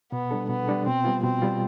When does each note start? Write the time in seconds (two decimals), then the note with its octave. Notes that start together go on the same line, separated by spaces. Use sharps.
0.12 B2 B3
0.31 G3 D4 A4
0.49 B2 B3
0.67 G3 D4 A4
0.87 B2 C4
1.05 G3 B3 F4
1.23 B2 C4
1.42 G3 B3 F4